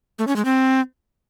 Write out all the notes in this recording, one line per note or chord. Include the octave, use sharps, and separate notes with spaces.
A3
C#4
G#3
C4